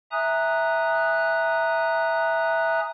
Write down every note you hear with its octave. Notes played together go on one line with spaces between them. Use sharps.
E5 G#5 A#5 D#6 F#6